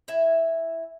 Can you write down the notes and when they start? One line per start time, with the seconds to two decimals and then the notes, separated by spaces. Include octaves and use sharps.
0.08 E4 E5 G#5